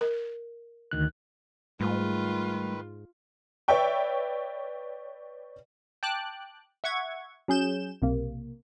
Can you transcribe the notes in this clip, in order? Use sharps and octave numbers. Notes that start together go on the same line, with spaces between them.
A#4
D2 D#3 F#6
G#2 D#3 G3 A3 F4 B4
B4 C#5 D5 E5 G5 C#6
G5 A5 D6 F#6
E5 F#5 C#6 G#6
F#3 C#4 G#4 G6 E7
B1 C3 A#3